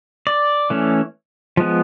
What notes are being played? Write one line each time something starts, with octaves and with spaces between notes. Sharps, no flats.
D5
E3 A3 C#4
F3 G#3 B3